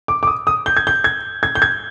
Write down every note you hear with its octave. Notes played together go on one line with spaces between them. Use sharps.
D6
D6
D#6
D#6
G6
G#6
G6
G#6
G#6
G6
G#6